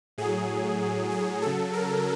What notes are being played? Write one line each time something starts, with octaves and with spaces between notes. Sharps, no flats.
A2 F#3 G#4
G#4
C#3 F#3 A4
A#4